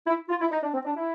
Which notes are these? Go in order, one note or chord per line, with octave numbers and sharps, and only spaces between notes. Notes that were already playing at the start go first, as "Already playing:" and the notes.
E4
F4
E4
D#4
D4
C4
D4
E4